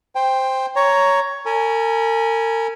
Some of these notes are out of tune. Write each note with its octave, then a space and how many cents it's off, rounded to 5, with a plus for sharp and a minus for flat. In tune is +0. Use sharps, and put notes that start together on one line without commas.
C5 +0 G5 +15
C#5 +10 A#5 +0
A#4 -40 G#5 +0 B5 -35